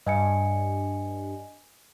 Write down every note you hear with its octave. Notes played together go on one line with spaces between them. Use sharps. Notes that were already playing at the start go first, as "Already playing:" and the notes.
G2 D#5 G#5 C#7